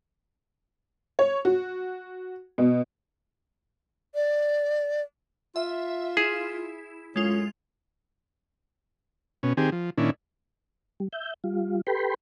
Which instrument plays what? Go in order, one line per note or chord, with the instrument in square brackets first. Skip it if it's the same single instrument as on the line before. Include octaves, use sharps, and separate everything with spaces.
[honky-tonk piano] C#5
F#4
B2
[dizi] D5
[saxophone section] F4 [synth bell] E5
[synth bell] E4 [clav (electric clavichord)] G#4
[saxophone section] F#2 A2 C#4 [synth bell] G#3 F4
[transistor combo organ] B2 C#4
D#3 C4 G4 G#4
F3
A#2 D#3 C#4 D4 E4
[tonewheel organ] G3
E5 G6
G3 F4
G4 A4 B4 G5 B5 C6